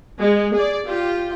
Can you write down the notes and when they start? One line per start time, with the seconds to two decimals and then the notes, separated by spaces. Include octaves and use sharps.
0.18 G#3
0.53 G#4 D5
0.86 F4 G4